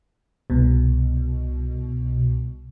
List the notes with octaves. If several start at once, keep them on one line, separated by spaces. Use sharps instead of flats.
C2 B2